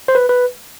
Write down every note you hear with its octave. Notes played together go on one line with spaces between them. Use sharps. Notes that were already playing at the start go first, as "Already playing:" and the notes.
C5
B4
B4